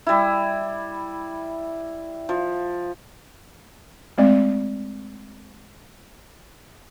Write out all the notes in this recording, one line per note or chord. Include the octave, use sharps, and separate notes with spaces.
G3 E4
F3
G#3 A3 C4 D5